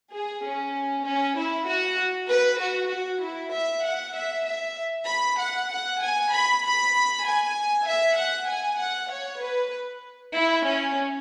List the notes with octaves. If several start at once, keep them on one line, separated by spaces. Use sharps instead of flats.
G#4
C#4
C#4
E4
F#4
B4
F#4
F#4
E4
E5
F#5
E5
E5
B5
F#5
F#5
G#5
B5
B5
G#5
E5
F#5
G#5
F#5
C#5
B4
E4
C#4